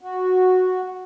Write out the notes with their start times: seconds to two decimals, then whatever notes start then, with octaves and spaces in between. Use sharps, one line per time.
0.01 F#4